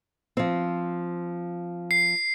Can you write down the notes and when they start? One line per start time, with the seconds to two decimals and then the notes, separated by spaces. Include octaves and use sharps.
0.37 F3 C4
1.91 C7